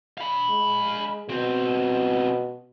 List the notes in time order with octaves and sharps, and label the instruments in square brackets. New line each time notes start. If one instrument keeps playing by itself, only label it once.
[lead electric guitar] F5 B5
[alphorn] G#3
[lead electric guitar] C#2 C4 [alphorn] B2